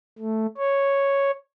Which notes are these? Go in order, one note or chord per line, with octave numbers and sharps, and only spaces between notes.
A3
C#5